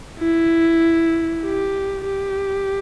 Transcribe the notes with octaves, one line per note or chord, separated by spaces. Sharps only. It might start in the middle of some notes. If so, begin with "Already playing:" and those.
E4
G4
G4